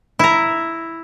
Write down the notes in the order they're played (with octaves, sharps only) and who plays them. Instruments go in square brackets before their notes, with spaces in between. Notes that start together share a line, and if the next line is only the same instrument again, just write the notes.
[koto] E4 A#5